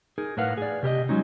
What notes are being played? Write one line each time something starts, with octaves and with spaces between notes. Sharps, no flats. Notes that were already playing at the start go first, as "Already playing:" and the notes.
D#4 G#4 A#4
A2 A#4 B4 F5 F#5
G#4 D5
C3 G4 A#4 D#5
F#3 G#3 C#4 D#4